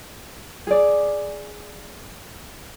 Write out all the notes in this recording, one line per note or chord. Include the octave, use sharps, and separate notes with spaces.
G#4 D5